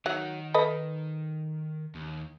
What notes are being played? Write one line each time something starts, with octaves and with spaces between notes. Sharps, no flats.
D#3 F#3 F#5
A4 B4 D#5
D#2